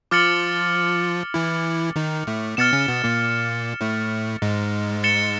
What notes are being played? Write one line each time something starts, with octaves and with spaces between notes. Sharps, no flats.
F3 F4 D6 F6 A6 C#7 F#7
E3 E4
D#3 D#4
A2 A3
B2 B3 F6 A6 C#7 E7
C#3 C#4
B2 B3
A#2 A#3
A2 A3
G#2 G#3
A6 C#7 E7 G7